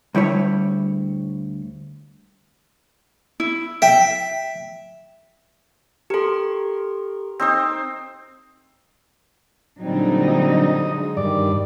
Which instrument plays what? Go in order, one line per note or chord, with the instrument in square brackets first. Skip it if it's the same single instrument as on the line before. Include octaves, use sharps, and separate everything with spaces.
[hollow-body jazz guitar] D2 G3 E4 C#5
[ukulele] E4
[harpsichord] E5 [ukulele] G5
[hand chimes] G4 A4 [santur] A#4 C6
[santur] C4 D#4 C5
[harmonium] A#2 G3 C4 [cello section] D3 F#3 D#4
[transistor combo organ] D#5
[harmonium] G#3
[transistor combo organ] G2 D5 [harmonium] D#3